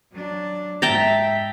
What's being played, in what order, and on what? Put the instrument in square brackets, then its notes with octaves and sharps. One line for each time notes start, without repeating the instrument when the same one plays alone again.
[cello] F#3 D4
[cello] G#2 E5 [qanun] G5 A5 A#5